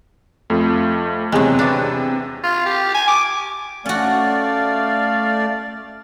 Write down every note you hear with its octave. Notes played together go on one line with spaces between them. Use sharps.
F2 A3 F4
E2 C3 F#3 G#3
B3 D4
F4
G4
G#5
D6
A3 C#4 F#4 D5 F5